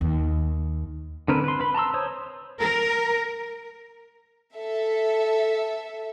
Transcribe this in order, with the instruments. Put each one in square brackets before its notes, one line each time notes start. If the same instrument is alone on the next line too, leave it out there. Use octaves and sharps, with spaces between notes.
[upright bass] D#2
[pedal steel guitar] D3 C4 A#4 B4
B4 C6
B4 B5
A5 A#5 C6 E6
C5 C#5 D#6
[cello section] A#4
[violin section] A4 E5